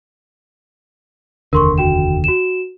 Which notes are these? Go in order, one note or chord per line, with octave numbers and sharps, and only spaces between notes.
F1 D#2 D3 A#4 C6 C#6
F#4 G5 E7
F#4 E7